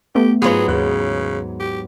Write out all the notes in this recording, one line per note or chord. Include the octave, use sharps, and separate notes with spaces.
A3 B3 G4
G#2 F#3 B3 F4 G#4 B4
D#2 C#3
G4